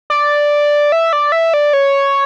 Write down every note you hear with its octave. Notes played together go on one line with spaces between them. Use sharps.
D5
E5
D5
E5
D5
C#5